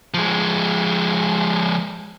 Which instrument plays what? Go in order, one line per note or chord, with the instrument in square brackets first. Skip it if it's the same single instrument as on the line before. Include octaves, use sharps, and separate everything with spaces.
[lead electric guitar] F3 G#3